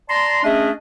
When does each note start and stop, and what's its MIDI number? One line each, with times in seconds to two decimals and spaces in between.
0.09 0.39 74
0.09 0.39 81
0.09 0.39 82
0.09 0.39 84
0.43 0.70 57
0.43 0.70 61
0.43 0.70 62
0.43 0.70 68
0.43 0.70 75
0.43 0.70 76